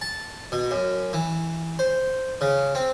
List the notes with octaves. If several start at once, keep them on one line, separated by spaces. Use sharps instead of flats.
A5
B2
F#2
E3
C5
C#3
C4